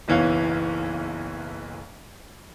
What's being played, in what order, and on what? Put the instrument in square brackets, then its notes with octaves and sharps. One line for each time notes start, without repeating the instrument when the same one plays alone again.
[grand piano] F#1 B1 E3 C#5 F5